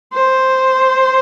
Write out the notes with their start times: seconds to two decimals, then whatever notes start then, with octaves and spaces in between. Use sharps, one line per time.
0.14 C5